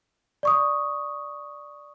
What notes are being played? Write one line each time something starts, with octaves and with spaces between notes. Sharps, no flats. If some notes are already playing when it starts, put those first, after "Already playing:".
D5 C#6 D#6